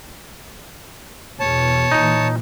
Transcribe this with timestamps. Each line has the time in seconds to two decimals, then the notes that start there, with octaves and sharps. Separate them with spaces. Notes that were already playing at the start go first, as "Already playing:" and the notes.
1.40 E2 B2 C#5 A5
1.91 A#2 E3 D#4